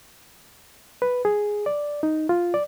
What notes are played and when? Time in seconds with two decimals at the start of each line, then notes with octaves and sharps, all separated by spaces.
1.02 B4
1.25 G#4
1.66 D5
2.03 D#4
2.29 F4
2.54 D5